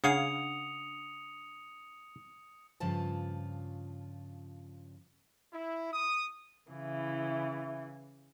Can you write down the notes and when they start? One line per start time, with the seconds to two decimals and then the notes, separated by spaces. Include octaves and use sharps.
0.04 C#3 D4 G#4 F5 F#5 D#6 C#7 F7
2.80 G2 C#3 F3 F4 A5
5.52 E4
5.92 D#6
6.70 C#3 E3 E4